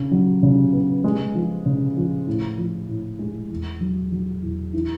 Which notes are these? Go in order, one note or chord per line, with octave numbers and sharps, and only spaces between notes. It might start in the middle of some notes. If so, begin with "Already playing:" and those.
Already playing: C#3
F#3
C#3
B3
G#3
F3
C#3
F3
A2
F3
A2
G#3
E2
F#3
F#3
E2
E3